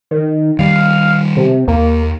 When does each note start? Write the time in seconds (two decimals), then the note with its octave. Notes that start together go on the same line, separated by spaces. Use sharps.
0.11 D#3
0.59 D#3 G3 F5
1.37 C3
1.68 D#2 A#3